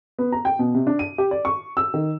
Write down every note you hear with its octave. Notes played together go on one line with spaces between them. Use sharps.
B3
A#5
G5
B2
C3
D4
D#7
G4
D5
C#6
E6
D#3